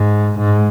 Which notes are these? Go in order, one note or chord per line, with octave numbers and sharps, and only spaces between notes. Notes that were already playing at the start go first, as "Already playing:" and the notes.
Already playing: G#2
G#2